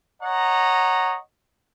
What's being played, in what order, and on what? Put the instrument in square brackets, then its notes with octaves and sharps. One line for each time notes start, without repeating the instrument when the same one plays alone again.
[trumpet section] C#5 D#5 F#5 A#5